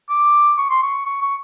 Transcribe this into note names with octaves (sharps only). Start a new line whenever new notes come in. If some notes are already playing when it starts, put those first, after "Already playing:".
D6
C#6
C6
C#6
C#6
C#6